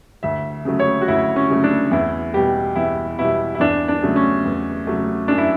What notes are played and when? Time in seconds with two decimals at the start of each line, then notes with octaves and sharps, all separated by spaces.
0.23 D2 E5
0.65 C#3 F#3 A3
0.79 C#5
1.02 F#4
1.08 D2 E4
1.36 C#4
1.50 C#3 F#3 A3
1.64 D4
1.91 E2 E4
2.33 B2 G3 G4
2.76 E2 E4
3.19 B2 G3 E4
3.55 E4
3.60 E2 D4
3.88 D4
4.03 C#3 F#3 A3
4.16 C#4
4.45 E2
4.87 C#3 F#3 A3
5.28 F#2 D4
5.38 E4